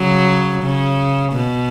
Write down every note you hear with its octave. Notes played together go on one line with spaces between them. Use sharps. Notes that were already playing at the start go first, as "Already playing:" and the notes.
Already playing: C#3 F#3
C#3
B2